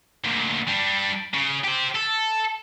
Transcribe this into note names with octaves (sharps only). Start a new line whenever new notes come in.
D2 A#2
G3 D4
C#3
G4 C5
A4